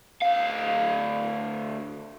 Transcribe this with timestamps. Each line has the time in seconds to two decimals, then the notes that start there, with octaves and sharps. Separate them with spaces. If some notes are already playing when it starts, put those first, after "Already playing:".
0.22 D2 F5